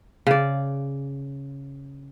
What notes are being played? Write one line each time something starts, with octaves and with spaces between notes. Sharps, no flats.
C#3 D5